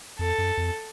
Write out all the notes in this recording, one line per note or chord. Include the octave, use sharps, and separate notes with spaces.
F2 A4
F#2
F2